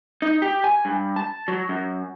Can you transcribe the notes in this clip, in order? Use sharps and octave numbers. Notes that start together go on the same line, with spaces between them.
D#4
G4
G#5
G2
A5
F#3
F#2